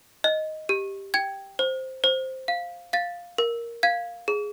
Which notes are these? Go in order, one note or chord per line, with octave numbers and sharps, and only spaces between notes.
D#5
G4
G5 G#6
C5
C5
F5
F5 A6
A#4
F5 G#6
G#4